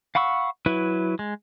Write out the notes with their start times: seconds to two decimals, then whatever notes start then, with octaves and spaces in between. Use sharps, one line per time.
0.15 F5 F#5 B5 C#6 E6
0.66 F#3 E4 B4 E5
1.19 G#3